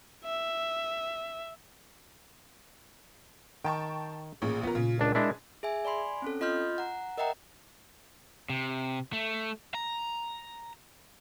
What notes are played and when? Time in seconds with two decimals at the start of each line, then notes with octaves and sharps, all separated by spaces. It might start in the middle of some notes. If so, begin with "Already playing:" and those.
0.25 E5
3.65 D#3 G5 A5 C#6
4.42 A1 A#2 G#4 C#5
4.63 D3 E3 B3 F4 A#4
4.75 A#2 C#3
4.99 C#2 D4 A#4
5.15 G#3 D4 E4 G#4
5.63 G#4 E5 G#5
5.85 D5 G#5 B5 C6
6.22 C4 C#4 A4
6.41 F4 D#5 C6 F6 G6
6.78 F#5 A#5
7.17 A#4 D#5 E5 F#5 G5 A#5
8.50 C3
9.13 A3
9.75 A#5